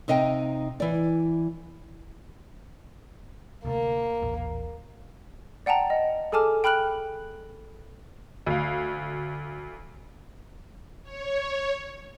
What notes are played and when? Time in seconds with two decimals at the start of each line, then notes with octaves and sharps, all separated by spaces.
0.08 C3 D#4 D#5 F5 G5
0.80 E3 D5
3.65 D2 C3 A3 A#3
4.22 D#1 A1
5.66 D5 F#5 G5 A5 A#5
5.90 D#5
6.32 G#4 A4 G#5 A5 D6 F6
6.64 G5 B5 F6 F#6 F#7
8.46 D2 F5
11.03 C#5